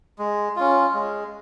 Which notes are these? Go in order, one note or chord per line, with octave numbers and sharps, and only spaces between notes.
G#3
C#4 F4
G#3